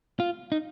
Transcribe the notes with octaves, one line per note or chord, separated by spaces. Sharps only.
F4
D#4